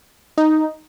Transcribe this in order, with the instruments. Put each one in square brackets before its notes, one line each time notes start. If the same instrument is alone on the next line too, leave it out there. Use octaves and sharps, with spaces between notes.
[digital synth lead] D#4